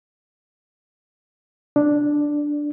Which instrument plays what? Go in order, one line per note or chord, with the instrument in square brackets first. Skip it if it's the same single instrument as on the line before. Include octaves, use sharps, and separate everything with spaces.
[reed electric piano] D4